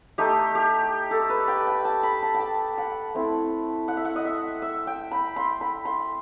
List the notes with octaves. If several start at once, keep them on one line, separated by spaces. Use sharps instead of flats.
A3 D#4 G4
G4
A4
B4
G5
G5
A5
B5
A5
G5
A5
F#5
A3 C4 E4
F#5
E5
F#5
D#5
E5
E5
G5
B5
C6
B5
C6